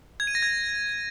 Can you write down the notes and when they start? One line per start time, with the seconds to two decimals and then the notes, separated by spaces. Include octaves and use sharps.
0.20 G#6
0.27 D#7
0.35 A#6
0.42 G#6